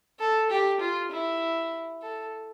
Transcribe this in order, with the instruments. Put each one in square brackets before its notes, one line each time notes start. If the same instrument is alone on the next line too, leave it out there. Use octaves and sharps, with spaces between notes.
[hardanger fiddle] A4
G4
F4
E4
A4